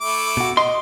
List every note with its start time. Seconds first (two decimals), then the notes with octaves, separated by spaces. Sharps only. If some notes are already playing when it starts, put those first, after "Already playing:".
0.01 A3 E4 D6
0.37 B2 F#4
0.57 D#5 C6